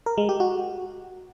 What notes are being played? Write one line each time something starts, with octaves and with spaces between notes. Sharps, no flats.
A#4
G#3
G4
F#4